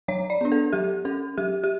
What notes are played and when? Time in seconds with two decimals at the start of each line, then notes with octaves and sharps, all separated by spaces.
0.08 F#3 C#5
0.30 D5
0.41 B3 D4
0.52 A4
0.73 F#3 G4
1.05 C#4 A4
1.38 F#3 G4
1.64 G4